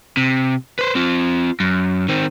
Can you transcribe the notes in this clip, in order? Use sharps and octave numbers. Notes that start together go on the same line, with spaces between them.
C3
B4 C5
C4 F4
F#2
D#3 C4